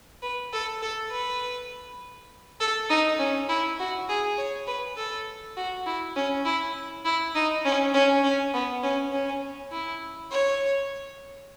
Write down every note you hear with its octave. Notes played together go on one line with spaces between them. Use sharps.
B4
A4
A4
B4
A4
D#4
C#4
E4
F#4
G#4
C#5
B4
A4
F#4
E4
C#4
E4
E4
D#4
C#4
C#4
C#4
B3
C#4
C#4
E4
C#5